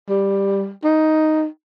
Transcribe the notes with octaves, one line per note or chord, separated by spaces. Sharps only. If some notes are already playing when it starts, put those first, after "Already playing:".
G3
D#4